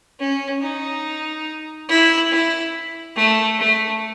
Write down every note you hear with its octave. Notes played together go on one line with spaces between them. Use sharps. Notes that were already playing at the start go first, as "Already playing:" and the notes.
C#4
D#4
E4
E4
A3
A3